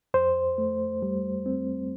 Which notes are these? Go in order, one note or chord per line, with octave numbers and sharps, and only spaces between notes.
F2 C5
A3
G3
C4